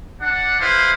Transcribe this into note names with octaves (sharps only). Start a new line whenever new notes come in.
D4 F#5
E4 G#4 B4 C5 F5